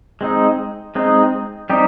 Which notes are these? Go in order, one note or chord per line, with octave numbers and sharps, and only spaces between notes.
G#3 C4 D#4
G#3 C4 D#4
G3 C4 D#4 G4